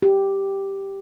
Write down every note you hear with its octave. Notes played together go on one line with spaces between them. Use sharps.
G4